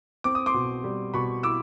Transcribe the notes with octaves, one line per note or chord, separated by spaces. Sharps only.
C4 D6
D#6
C6 D6
B2
G3
B2 B5 C#6
E4 D6 E6